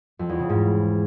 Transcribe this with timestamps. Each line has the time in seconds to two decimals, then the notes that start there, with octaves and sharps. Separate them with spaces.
0.19 F2
0.29 E2
0.39 C#3
0.50 G#2